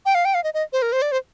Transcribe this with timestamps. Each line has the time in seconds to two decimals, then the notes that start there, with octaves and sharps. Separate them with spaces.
0.06 G5
0.15 F5
0.25 G5
0.34 F5
0.44 D#5
0.54 D#5
0.73 C5
0.82 A#4
0.92 C5
1.02 D5
1.12 C5